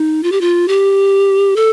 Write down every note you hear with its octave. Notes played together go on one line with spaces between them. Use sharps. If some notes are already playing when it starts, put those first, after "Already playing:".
Already playing: D#4
F4
G4
F4
G4
A4